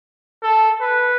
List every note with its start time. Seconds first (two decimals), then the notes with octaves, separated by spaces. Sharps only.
0.42 A4
0.81 B4